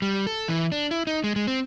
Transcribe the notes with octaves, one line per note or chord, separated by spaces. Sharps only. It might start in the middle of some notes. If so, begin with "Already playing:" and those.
G3
A4
E3
D4
E4
D#4
G#3
G#3
C4